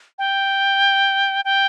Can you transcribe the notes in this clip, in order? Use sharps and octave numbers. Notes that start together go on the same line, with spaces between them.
G5
G5